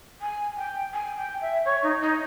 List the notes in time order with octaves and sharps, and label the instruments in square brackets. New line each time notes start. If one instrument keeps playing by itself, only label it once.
[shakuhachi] G#5
G5
G#5
G5
E5
C#5
D#4
D#4